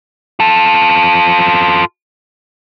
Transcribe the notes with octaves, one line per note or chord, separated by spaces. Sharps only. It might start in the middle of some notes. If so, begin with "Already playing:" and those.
F4 A4